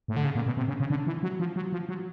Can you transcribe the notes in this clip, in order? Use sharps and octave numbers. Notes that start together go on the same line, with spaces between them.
A2
D3
C#3
A#2
B2
C3
C#3
C#3
D3
E3
F#3
F3
F#3
F3
F#3